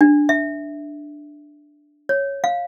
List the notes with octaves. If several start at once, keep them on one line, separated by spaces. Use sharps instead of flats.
D4
E5
C#5
F5